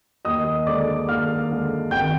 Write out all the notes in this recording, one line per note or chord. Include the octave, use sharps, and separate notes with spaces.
D#2 D#5 D#6
D3 G#3 D5 D6
D#2 F5 F6
D3 G#3
G#1 G5 G6